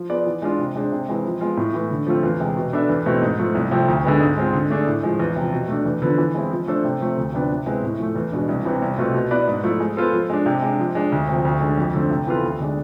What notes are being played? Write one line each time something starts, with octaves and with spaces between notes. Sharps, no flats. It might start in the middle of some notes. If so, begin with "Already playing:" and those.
Already playing: F3
B3 F4 G#4 D5
E3
G#3 D4 F4
C3
G#3 D4 G#4 C5
C3
E3 G#3 C4
F3
G#3 B3 F4
A2
E3 A3
D3
F3 A3 C4 F4
E2
C3 G#3
B2
B3 D4 A4 E5
E2
B2 A3 C4 E4
G#2
F3 A3
C2
C3 F3 A3 C4
D2
D3 G#3 B3
G#2
G#3 C4 F4
D3
A3 D4 G#4
A2
F3 G#3
E2
C3 F3
B2
A3 D4
E2
D3 F3 B3
E3
G#3 C4 E4
F3
A3 D4 A4 C5
C3
F3 A3 C4
D2
C3 F3 B3 D4
C3
G#3 C4 E4 B4
A2
F3 A3
E2
B2 G#3 D4
C2
C3 E3
C2
B2 A3 C4 F4
B2
B3 E4 B4 D5
G#2
F3 A3 E4
G#3
B3 F4 A4 C5
F3
G#3 D4
C3
G#3 D4
F3
G#3 D4
D2
C3 F3
D2
D3 G#3
F2
D3 A3 C4
C3
E3 B3 F4 A4
D2
D3 G#3 D4